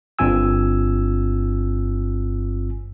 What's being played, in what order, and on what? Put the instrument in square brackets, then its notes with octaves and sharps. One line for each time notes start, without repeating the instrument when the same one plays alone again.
[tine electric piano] G1 G2 C4 F4 G#5 E6